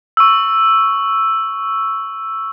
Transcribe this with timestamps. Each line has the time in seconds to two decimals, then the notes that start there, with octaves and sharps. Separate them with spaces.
0.17 C#6 E6